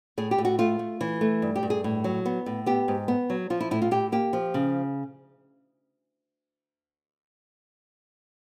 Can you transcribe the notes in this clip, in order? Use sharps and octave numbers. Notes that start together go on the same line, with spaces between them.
A2 G#4
G4
A2
F#4
A3 F4
A3
E3
A3
G2
G4
G2
G#4
A2
F#3
B3
A2
B3 G4
G#2
B3
F#3
F3 F4
E4
A2 E4
F4
A2 G4
A#3 G4
F3
C#3